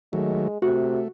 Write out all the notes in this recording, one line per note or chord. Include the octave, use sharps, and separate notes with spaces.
D#3 F#3 G#3 A3
C3 A3 F#4